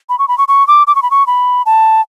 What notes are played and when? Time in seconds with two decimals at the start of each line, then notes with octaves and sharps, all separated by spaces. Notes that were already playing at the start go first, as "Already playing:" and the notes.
0.09 B5
0.19 C#6
0.28 B5
0.38 C#6
0.48 C#6
0.68 D6
0.87 D6
0.95 C#6
1.03 B5
1.11 C#6
1.27 B5
1.66 A5